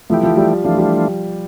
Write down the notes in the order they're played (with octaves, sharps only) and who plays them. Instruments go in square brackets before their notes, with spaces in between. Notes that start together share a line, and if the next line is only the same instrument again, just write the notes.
[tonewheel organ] E3 A3 E4 G4 [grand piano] F3
[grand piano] F3
G3
[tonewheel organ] E3 A3 D4 F4 [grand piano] F3
[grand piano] G3